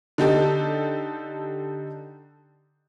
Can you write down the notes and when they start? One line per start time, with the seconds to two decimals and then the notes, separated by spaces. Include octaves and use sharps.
0.18 D3 D#4 G4 A4